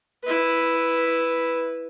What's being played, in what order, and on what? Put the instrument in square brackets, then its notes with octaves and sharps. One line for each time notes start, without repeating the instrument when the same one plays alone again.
[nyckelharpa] E4 B4